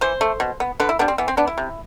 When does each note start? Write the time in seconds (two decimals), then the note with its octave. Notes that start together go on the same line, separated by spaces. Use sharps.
0.01 E3 C5
0.21 A3
0.40 B2
0.60 B3
0.80 D3 B4
0.89 E4
0.99 G3 B3 D4
1.08 C4
1.18 E3 B3
1.28 C4
1.37 B3 D4
1.47 E4
1.58 C3